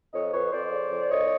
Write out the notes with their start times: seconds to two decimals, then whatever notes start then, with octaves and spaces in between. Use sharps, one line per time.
0.12 F2 C#5 D#5
0.32 F2 B4 C#5
0.52 F2 C5 D5
0.71 C#3
0.91 F2
1.10 C2 C#5 D#5